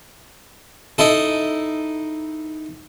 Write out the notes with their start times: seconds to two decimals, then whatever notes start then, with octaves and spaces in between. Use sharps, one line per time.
0.98 D#4 E4 A4